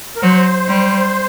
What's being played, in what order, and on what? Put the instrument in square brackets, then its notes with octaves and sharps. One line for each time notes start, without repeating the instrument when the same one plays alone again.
[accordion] A#4
[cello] F#3 [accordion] C5
[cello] G3